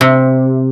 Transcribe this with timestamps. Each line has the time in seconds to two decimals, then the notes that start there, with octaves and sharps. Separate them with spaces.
0.01 C3